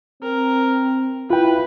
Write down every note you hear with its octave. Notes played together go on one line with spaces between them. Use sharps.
C4 A#4
E4 F4 B4 G5